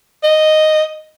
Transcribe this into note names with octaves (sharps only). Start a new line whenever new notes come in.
D#5